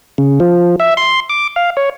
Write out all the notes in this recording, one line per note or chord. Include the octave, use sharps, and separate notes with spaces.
C#3
F3
E5
C6
D6
F5
C#5